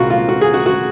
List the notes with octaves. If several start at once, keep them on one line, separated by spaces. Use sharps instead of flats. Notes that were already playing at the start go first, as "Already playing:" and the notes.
Already playing: C2 A#2 G#3 C4 F4 F#4 A#4
F4
F#4
G#4
F#4
F#4